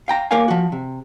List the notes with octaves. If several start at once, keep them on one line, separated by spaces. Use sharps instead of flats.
F5 G5 A#5
A#3 G4 A#4 C#5 F5 G#5
F3 F#4
C3